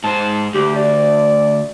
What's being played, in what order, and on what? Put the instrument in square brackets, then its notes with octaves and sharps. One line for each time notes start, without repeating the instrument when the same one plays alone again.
[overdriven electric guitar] G#2 C5 [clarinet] A5
[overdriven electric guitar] D2 [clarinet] G4
[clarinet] D5